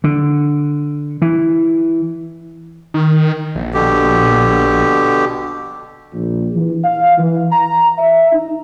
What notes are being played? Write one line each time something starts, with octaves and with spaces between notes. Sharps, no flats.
D3
E3
D#3
A#1
B2 D3 G4
A#1
E3
F5
E3
A#5
E5
D#4